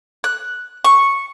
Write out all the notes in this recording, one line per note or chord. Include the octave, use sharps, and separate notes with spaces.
F#6
C#6